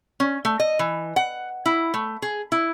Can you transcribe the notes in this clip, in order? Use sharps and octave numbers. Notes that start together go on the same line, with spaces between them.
C#4
A3
D#5
E3
F#5
E4
A3
G#4
E4